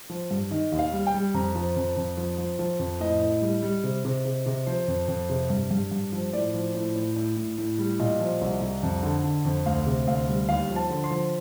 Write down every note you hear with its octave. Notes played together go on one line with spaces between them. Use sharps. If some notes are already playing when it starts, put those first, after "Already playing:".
F3
G2
D#3 D#5
D#2
F5
G3
G5
G3
F2 A#5
F3
F2
F2
F3
F3
F3
F2
A2 D#5
A2
G3
G3
C3
C3
C3
C3
F3 C5
F2
F2
C3
G2
G2
G2
F3
A2 D5
F3
A2
A2
A2
A2
A2
G3
A#2 D#5
F3
C2
C2
F2
D3
D3
F2
D2 F5
C3
D2 F5
G3
D#2 F5
F3
A5
D3
C6
F3